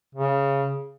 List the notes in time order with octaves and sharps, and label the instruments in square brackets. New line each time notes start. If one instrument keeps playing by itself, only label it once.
[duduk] C#3